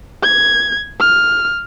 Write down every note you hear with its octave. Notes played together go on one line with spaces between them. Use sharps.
G#6
F6